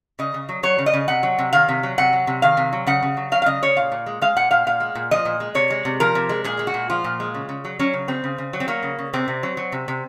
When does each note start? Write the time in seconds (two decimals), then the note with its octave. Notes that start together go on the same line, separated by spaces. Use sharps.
0.19 C#3 D#5
0.34 C#3
0.49 F#3
0.63 F#3 C#5
0.78 C#3
0.86 D#5
0.93 C#3
1.08 C3 F#5
1.23 F#3
1.39 C3
1.53 D#3 F5
1.69 C3
1.83 F#3
1.98 C3 F#5
2.13 F#3
2.27 C3
2.42 D#3 F5
2.57 C3
2.73 F#3
2.87 C#3 F#5
3.03 C#3
3.17 F#3
3.32 F#3 F5
3.42 F5
3.46 C#3 D#5
3.62 C#3 C#5
3.76 A#2 F5
3.92 A#2
4.06 G#3
4.22 G#3 F5
4.36 A#2 F#5
4.51 A#2 F5
4.66 A#2 F5
4.80 G#3
4.95 A#2
5.11 F3 D#5
5.25 A#2
5.40 G#3
5.55 C3 C#5
5.70 G#3
5.85 C3
6.00 F3 A#4
6.15 C3
6.29 G#3
6.44 A#2 G#4
6.59 G#3
6.67 F#4
6.74 A#2
6.90 F3 F4
7.04 A#2
7.20 G#3
7.34 C#3
7.49 C#3
7.65 F#3
7.79 F#3 C#4
7.93 C#3
8.08 C#3 C4
8.24 C#3
8.38 C#3
8.53 F#3
8.60 C4
8.68 F#3 A#3
8.83 C#3
8.99 C#3
9.13 C3 C4
9.28 C3
9.43 F#3
9.57 F#3
9.72 C3
9.88 C3